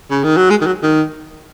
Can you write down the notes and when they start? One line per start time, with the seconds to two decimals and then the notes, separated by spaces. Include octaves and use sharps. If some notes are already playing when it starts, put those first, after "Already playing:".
0.10 C#3
0.23 D#3
0.37 F#3
0.50 G#3
0.61 D#3
0.66 F#3
0.82 D#3